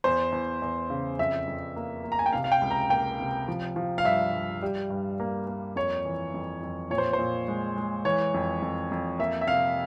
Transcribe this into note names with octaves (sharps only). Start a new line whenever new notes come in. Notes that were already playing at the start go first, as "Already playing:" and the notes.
E2 C5
E2
E2
C#3
F2 E5
F2
A#3
A#3
A#5
G#5
G5
C3 F5
F5
G5
C#2
A#5
A#3 G5
C3
F3
F3
F5
G2 E5
G2
G3
G2
A#3
A#3
F2 C#5
E3
F2
F2
A#2 C#5
C5
C5
A#2
G#3
G#3
E3 C#5
F2
F2
F2
A#3 E5
E5
C3 F5